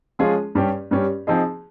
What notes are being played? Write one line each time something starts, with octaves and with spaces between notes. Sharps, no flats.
F3 G#3 C#4 F4 G#4
G2 G3 C#4 G4
G2 G3 C#4 G4
F3 C4 D#4 G#4